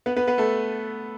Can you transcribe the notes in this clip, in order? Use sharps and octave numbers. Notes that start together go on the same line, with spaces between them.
B3 B4
B3 B4
B3 B4
A3 A4